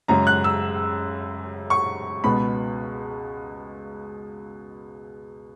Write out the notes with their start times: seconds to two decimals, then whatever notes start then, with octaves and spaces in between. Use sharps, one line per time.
0.08 F#2 C#3 G#3 C#4 A#5
0.27 F#6
0.44 E6
1.70 C#6
2.24 C#2 B2 G#3 B3 B5